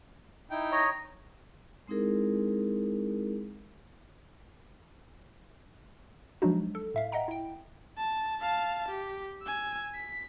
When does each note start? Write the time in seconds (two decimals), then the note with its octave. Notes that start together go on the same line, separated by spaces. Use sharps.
0.51 D#4 E4 G5
0.72 C#5 D#5 A#5
1.88 G#3 C4 D#4 E4 G#4 A#4
6.42 F3 F#3 G#3 D4 D#4 F#4
6.75 A4
6.94 A2 E5 F5
7.12 D#5 E5 F#5 G5 A#5
7.28 E4 G5
7.97 A5
8.41 F5 A5
8.89 G4
9.43 G#5 E6
9.95 B6